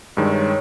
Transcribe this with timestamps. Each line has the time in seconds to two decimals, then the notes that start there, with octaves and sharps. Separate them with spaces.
0.17 G2 D#3 G#3 C#5
0.24 D5
0.32 C#5